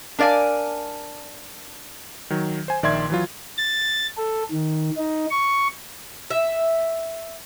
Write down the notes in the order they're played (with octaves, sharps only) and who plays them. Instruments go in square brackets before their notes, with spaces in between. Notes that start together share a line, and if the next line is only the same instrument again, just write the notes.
[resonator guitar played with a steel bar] D4 A#4 D5 F5 G#5
[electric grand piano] D#3 F#3
C5 G#5
A#1 D#3 D5 E5 C6 G#6
E3 F#3 F4
[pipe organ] A6
A4
D#3
D#4
C#6
[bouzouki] E5